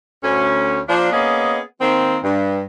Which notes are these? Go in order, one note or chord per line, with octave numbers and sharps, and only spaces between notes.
D2 C#4
F3 A#3 D4
A#3 B3 C#4 G#4 D#5
D#3 A#3 C4
G2